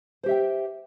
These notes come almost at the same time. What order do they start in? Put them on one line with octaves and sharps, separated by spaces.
C5 G4 E5 G5